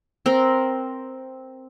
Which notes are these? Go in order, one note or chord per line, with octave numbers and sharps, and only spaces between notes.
C4 A#4